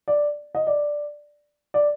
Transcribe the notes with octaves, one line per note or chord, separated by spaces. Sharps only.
D5
D#5
D5
D5